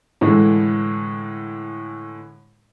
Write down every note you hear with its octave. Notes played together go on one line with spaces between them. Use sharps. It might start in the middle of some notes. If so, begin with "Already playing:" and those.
A2 D3 E3 G#3 A3